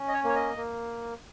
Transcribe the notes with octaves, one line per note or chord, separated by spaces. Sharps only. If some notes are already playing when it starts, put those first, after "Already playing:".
Already playing: C#4
D#5
C#5
A#3 C#5
D#5
A#3